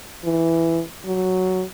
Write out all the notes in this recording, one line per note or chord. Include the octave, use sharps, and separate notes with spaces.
E3
F#3